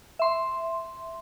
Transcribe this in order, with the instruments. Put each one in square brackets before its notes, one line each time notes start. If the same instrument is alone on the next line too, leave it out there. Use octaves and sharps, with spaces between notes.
[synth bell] E5 C6